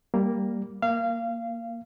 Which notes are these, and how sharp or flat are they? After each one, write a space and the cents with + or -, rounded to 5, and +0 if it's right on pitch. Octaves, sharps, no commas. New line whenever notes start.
G3 +0 A#3 +0
A#3 +0 F5 -25